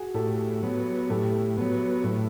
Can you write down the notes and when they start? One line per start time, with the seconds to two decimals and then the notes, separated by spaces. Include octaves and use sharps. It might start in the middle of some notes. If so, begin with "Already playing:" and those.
Already playing: F#4 G#4
0.14 A2 G4 A4
0.62 F#3 B3
1.10 A2 G4 A4
1.57 F#3 B3
2.04 A2